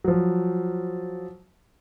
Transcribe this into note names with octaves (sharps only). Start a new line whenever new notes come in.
F3 F#3